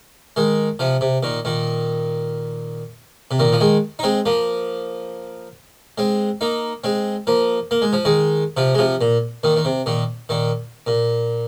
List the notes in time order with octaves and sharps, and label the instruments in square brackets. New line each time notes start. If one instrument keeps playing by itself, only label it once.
[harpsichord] D#3 G#3
C3 F3
C3
A#2 D#3
A#2 D#3
C3
A#2 D#3
F3
D#3 G#3
D#4
G#3 C4
F3 A#3
G#3 C4
A#3 D#4
G#3 C4
F3 A#3
A#3
G#3
F3
D#3 G#3
C3 F3
G#3
C3 F3
A#2
A#2 D#3
D#3
C3
A#2 D#3
A#2 D#3
A#2